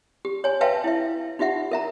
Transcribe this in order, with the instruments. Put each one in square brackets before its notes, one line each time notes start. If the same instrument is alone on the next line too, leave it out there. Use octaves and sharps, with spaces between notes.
[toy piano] G4
C#5 G#5
B4 E5 F5 G5 A5
E4 E5
D#4 F4 G4 E5 F#5
A#4 E5 A#5